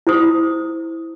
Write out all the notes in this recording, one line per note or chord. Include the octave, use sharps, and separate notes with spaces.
E4 C5 D#6